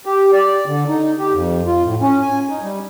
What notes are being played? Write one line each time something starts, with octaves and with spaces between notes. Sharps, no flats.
G4
D5
D3
D#4
G4
F2
F4
A2
C#4
G#5
D#4
G3